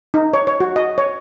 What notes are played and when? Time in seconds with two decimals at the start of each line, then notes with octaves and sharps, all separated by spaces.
0.14 D#4
0.34 C#5
0.47 C#5
0.60 F#4
0.76 D#5
0.98 C#5